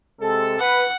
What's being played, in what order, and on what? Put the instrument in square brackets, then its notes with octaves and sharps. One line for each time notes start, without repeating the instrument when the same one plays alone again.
[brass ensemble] C3 G#3 A4
[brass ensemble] B4 [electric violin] F#5